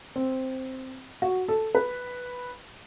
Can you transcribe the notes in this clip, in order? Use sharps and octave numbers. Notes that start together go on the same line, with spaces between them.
C4
F#4
A4
B4